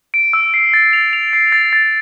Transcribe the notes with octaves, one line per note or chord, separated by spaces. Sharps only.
D7
E6
C7
A6
F7
F7
C7
A6
A6